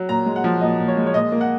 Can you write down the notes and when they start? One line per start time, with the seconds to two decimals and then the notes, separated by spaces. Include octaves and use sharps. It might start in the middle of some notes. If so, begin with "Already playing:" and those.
Already playing: F#3
0.09 A#2 A#5
0.26 G#3
0.36 F#5
0.44 F3
0.61 A#2 D#5
0.80 A#2
0.88 C#5
0.97 G#3
1.07 C#5
1.14 A#2 D#5
1.32 A#3
1.41 F#5